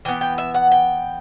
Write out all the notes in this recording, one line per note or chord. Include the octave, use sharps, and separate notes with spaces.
E3 B3 G5
G5
E5
F#5
G5